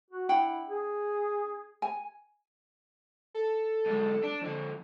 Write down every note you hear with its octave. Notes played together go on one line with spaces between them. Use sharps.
F#4
D4 E4 F#5 G5
G#4
G#5
A4
B1 G#3
D4
F2 D3